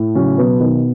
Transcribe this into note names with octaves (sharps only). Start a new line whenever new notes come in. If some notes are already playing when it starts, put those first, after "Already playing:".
Already playing: A2
C#3 F#3 C#4
B2 F#3 B3
B2 D#3 D#4